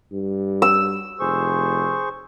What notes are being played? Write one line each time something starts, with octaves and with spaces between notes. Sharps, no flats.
G2
E6
F1 G#4 C5 C#6